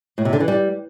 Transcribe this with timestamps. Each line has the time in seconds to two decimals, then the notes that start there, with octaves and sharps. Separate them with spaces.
0.18 A2
0.25 C3
0.33 D3
0.40 E3
0.48 G3